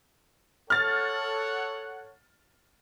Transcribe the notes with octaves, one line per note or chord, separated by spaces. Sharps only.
A4 C#5 F#5 F6 A6